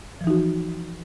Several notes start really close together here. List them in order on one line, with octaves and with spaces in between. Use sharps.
F3 E3 D#4 F#4